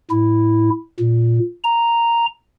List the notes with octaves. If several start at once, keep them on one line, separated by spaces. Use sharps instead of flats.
A2 E4
A#2
A#5